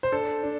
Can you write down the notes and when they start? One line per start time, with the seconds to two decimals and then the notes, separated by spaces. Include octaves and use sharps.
0.03 C5
0.12 D4 A4
0.43 D4